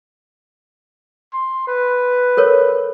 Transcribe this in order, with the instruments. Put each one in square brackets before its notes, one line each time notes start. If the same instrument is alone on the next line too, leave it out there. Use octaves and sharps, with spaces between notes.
[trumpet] C6
B4
[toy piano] A4 A#4 C#5